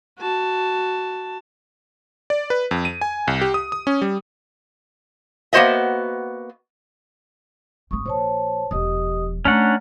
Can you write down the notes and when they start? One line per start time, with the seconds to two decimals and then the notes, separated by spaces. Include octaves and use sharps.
0.19 F#4 A5
2.30 D5
2.50 B4
2.71 F2
2.85 D#7
3.01 G#5
3.27 C2
3.41 G4
3.54 D#6
3.72 D#6
3.87 C#4
4.02 G3
5.53 A#3 B3 F#4 C5 D#5 E5
7.91 G#1 G#2 C#6 D#6
8.06 A#1 C5 C#5 A5
8.71 E1 F3 G4 D#5 D#6
9.45 A3 C#4 D4 F#5 A#5 C#6